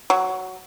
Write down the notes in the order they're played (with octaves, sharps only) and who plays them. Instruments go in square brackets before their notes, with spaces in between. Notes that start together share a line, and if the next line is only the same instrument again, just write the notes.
[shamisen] F#3